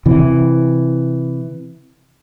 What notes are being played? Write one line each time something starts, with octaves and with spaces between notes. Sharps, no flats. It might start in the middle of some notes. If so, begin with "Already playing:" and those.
C3 E3